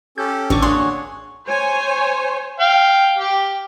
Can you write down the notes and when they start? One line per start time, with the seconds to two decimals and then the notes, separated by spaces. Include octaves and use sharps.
0.18 C#4 G4 A4 G6
0.50 A1 D3 C#6
0.62 A#3 D4 F#4 G#4 C#5 C6
1.48 C5 C#5 G#5
2.60 F5 G5
3.18 G4